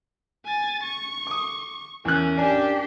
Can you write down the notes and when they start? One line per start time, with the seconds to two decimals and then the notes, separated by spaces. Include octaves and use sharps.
0.45 G#5 A6
0.83 C#6
1.27 D6 D#6
2.05 E2 C#4 A#4 F#6
2.38 D4 G4 D5 G#5